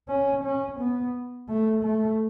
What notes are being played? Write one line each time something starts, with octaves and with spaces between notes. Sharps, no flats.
C#4
C#4
B3
A3
A3